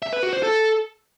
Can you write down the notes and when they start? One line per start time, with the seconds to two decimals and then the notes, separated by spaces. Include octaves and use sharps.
0.02 E5
0.13 B4
0.23 F#4
0.33 C5
0.43 A4